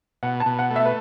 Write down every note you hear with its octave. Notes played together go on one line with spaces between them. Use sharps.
B2 F#5
A5
B2
F#5
A3
E5
B4